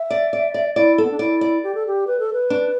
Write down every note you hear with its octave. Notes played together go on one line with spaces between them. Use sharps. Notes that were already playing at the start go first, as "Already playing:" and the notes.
Already playing: E5
D5
D5
D5
E4 D5
B3 A4
D4
E4 D5
D5
G4
A4
G4
B4
A4
B4
D4